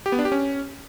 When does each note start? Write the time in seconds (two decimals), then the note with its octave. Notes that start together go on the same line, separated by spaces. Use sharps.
0.06 G4
0.12 B3
0.19 D4
0.25 G4
0.32 C#4